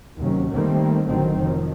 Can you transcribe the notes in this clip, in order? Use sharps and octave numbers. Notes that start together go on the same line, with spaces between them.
D#2 C3 F#3 C#4
D#3 G3 A3 A#3 C4
A1 D3 D#3 F#3 C4
F1 D#3 F3 F#3